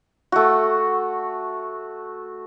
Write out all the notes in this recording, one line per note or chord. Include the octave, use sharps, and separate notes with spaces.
A3 F#4